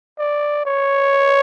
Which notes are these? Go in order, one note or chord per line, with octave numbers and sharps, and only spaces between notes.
D5
C#5